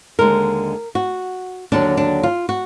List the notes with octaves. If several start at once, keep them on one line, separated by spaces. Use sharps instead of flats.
D#2 D3 G#3 A#4
F#4
D#2 D3 F#3 D4
D4
F4
F#4